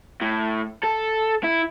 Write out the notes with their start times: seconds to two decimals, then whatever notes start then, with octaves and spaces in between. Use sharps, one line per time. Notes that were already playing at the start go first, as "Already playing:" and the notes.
0.21 A2
0.84 A4
1.44 E4